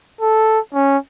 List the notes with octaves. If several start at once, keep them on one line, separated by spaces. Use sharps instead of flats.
A4
C#4